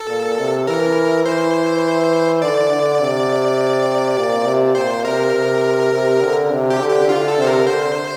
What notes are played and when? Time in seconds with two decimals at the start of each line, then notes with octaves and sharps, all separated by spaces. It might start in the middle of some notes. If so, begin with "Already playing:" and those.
Already playing: A4
0.09 A#2
0.39 C3
0.67 E3 A#4
1.25 E3 C5
2.42 D3 D5
2.72 D3
3.01 C3
4.17 A#2
4.46 C3
4.75 A#2 C5
5.05 C3 A#4
5.34 C3
5.93 C3
6.21 D3
6.51 C3
6.70 G4
6.80 D3
6.89 G4
7.08 D3 F4
7.28 A4
7.38 C3 C5
7.47 A#4
7.67 D3 C5